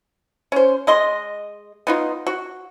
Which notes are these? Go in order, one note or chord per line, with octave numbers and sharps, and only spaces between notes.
C#4 C5
G#3 D#5 C6
B3 D#4 F4
F#4